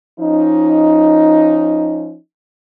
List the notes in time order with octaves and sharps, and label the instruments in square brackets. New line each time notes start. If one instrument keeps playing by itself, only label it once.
[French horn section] F3 C#4 D#4